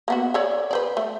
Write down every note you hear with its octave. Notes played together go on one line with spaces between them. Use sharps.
A#3 B3 F#4
A4 C#5 D5
B4 C5 D5
A3